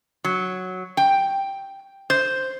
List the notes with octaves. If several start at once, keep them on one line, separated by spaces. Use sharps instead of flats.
F#3
G5
C5